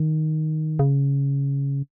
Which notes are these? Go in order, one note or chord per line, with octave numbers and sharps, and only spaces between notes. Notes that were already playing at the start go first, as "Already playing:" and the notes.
Already playing: D#3
C#3